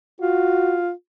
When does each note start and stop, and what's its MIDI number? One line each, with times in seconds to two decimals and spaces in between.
0.21 0.90 65
0.21 0.79 66